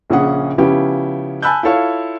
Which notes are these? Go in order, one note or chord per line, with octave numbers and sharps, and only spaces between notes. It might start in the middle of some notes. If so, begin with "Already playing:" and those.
A#1 A#2 C#3 C#4 G#4 F#5
C#3 F3 B3 C#4 E4 G4
G#5 A5 B5 E6 F#6 G6
E4 F4 A4 C#5 F5